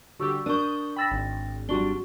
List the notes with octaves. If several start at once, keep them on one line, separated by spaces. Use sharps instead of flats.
D3 G3 F#4 G4 C#6 E6
D4 A#4 C#6 D#6 G6
G5 B5 E6 A6 A#6
G#1
G3 D4 F#4 C#6 G7